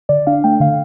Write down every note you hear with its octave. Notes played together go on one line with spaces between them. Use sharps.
D3 D5
D4 F5
A3 G5
D3 F5